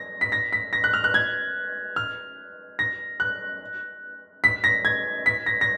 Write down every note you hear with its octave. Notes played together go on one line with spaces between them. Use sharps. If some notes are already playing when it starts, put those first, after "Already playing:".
Already playing: A#6
B6
A#6
B6
A#6
F#6
F6
F#6
G#6
F6
A#6
F#6
B6
A#6
G#6
B6
A#6
A#6